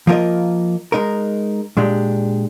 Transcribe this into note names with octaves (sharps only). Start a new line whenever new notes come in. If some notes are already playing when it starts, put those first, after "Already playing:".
F3 A#3 F4 A#4 D#5
G#3 D#4 A#4
A#2 G#3 D4 G4